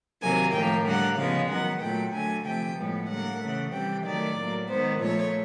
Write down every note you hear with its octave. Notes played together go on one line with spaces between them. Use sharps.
C3 D#3 F#3 A#3 G#5
A2 F3 A#3 G5
D3 G3 A#3 F#5
C#3 F3 G#3 B3 F5
D#3 F#3 B3 F#5
A#2 F#3 A3 G5
D3 F#3 A3 G#5
C3 F3 A3 G5
A2 F3 G#3 B3
D3 G3 A#3 F#5
C#3 E3 A3
C3 E3 G3 G5
D#3 F#3 A3 D5
A2 F#3 A#3
D#3 G#3 B3 C5
A#2 F3 A3 C#5